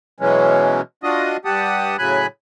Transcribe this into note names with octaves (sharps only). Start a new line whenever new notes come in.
B2 E3 F#3 G#3 C#4
D4 F4 F#4 D#5 D#6
G2 G4 F#5 A5 D#6
A2 C#3 F#3 G#5 B5 F#6